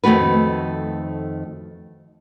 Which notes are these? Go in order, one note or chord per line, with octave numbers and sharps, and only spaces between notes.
F2 D#3 A3 F#4 B4